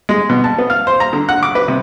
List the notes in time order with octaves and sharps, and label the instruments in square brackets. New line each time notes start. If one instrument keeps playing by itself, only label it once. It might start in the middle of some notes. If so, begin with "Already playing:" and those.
[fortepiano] G#3
B2
A5
B3
F5
C5
A#5
D3
F#5
D6
B4
C3